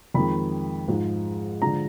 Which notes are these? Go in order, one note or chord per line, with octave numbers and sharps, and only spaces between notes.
F2 D#3 G#3 B5
G#2 F3 G#3
D3 F3 G#3 A#5